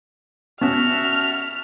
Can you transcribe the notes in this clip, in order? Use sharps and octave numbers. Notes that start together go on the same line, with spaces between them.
B3 C#4 F#4 E5 A5 F6